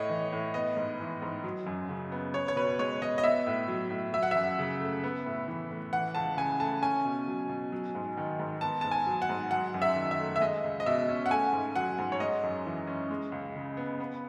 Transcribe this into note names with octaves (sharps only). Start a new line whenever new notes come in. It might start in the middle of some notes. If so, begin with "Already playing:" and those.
Already playing: A2 A3 C#5 D#5
E3
A2
B3 D#5
G#2
E3
G#2
F#3
F#2
C#3
B3
B3 C#5
C#5
B2 B4
G#3 C#5
B2 D#5
D#5
B3 E5
A2
F#3
A2
F#3 E5
F#5
F#2 E5
C#3
A3
B3
A2
E3
A2
E3 F#5
C#2 A5
C#3 G#5
A3 A5
C#4 G#5
B2
F#3
B2
F#3
G#2
D#3
G#2
B3 A5
G#2 A5
G#5
F#3
F#5
G#2
F#3 F#5
F#2
E5
D#3
E5
A3
E5
G#3 D#5
C#2
D#5
B2 E5
C#4
F#5
A3 G#5
G#2
F#3 F#5
G#2
C#5
G#3 D#5
F#2
E3
C#4
G#3
C#2
C#3
B3
B3